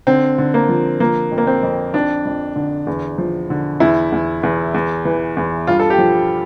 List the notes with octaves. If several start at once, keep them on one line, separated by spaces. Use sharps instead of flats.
D3 C4
D3
A#3
F3
F3 A#3
F2
A#3
C4
F2
F2 D4
F2
D3
E2
F3
D3
E2 E4
E2
E2
E2
E3
E2
G2 F4
A4
G4
F3